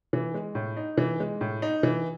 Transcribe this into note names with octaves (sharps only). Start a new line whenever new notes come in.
E3
G#3
A2
D#4
E3
G#3
A2
D#4
E3